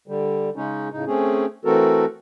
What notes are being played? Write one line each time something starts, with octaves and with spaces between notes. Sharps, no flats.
D3 G3
C#3 G#3 C#4 D#4
A2 C#3 D#4
A3 C4 C#4 G#4
E3 A3 C4 F#4 A4 A#4